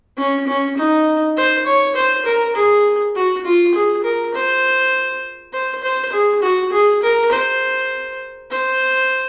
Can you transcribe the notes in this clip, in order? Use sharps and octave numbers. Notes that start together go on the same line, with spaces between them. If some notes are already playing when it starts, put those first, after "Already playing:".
C#4
C#4
D#4
C5
C#5
C5
A#4
G#4
F#4
F4
G#4
A#4
C5
C5
C5
G#4
F#4
G#4
A#4
C5
C5